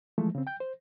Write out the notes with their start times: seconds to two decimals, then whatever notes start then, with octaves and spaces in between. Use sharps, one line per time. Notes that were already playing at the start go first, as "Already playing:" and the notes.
0.18 E3 F3 G#3 A3
0.35 C#3 C4
0.47 G5 G6
0.60 C5